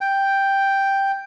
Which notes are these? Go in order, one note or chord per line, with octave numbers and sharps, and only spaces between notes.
G5